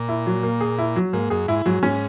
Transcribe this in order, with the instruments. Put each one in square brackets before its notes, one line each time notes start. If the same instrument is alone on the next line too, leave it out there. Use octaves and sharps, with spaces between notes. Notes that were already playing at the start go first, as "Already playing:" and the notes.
Already playing: [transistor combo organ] A#2
[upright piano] E4
F#3
A#3
G#4
E4
F#3
[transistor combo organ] G#2 [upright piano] A#3
[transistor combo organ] F#2 [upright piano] G#4
[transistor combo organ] G#2 [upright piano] E4
[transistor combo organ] G#2 [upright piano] F#3
[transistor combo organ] G#2 [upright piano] C#4